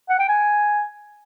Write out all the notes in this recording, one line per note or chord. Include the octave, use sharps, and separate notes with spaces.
F#5
G5
G#5